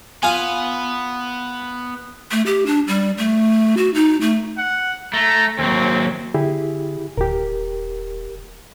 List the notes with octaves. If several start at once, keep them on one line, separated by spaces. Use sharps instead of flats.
B3 F4 G#5
A3
G4
D4
G3
A3
F#4
D#4
A3
F#5
A3 A#5
D#2 F#3 C4
D3 E4 G4 G#4
D#1 G4 A#4